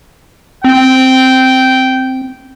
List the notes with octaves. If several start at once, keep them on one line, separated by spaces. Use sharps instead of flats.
C4 G5